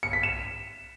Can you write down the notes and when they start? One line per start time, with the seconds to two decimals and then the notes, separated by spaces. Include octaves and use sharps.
0.03 C#7
0.13 B6
0.23 E7